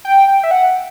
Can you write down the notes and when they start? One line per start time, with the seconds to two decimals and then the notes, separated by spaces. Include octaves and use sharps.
0.05 G5
0.28 G5
0.44 E5
0.51 F#5